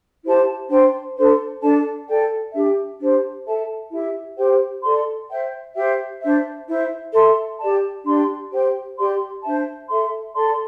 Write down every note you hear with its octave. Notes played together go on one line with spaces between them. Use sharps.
E4 G4 C5 A5
D4 C5 G5
D4 A4 C5
D4 A4 D5 A5
A4 D5 G5
D4 G4 E5
D4 G4 C5
A4 E5 A5
E4 G4 E5
G4 C5 G5
A4 D5 C6
C5 E5 G5
G4 C5 E5 G5
D4 C5 E5
E4 C5 E5
A4 E5 C6
G4 D5 A5
D4 G4 D5 C6
G4 C5 G5
G4 D5 C6
D4 C5 E5 A5
A4 E5 C6
A4 D5 A5 C6